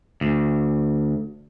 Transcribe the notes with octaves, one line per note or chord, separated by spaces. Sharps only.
D2